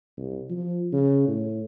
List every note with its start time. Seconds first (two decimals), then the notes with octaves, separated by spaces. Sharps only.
0.17 C2
0.50 F3
0.93 C#3
1.28 A2